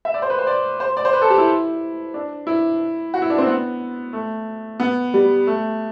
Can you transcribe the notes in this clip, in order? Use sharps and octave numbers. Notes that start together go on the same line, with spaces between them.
E5
D5
C5
B4
C5
D5
C5
D5
C5
B4
A4
G4
E4
D4
E4
F#4
E4
D4
C4
B3
A3
B3
G3
A3